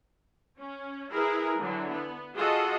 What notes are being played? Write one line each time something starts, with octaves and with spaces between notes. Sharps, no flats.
C#4
E4 G#4 A#4 B4
D3 E3 F#3
B3
F4 F#4 G#4 A4 D#5 F#5